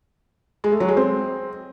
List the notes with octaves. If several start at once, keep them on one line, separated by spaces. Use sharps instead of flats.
G#3
A3
F#3
G#3
C4